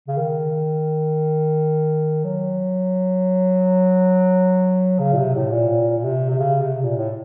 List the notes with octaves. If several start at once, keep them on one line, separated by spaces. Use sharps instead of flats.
C#3
D#3
F#3
C#3
A#2
C3
A2
A#2
A#2
A#2
C3
C3
C#3
C3
A#2
A2